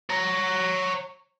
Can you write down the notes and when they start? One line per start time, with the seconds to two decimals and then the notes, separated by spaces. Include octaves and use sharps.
0.10 C#5 A#5